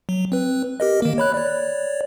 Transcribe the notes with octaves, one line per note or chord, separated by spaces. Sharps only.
F#3
C4 B4
G4 A#4 D#5
D#3 A#3
C#5 B5 F#6
C#5 D5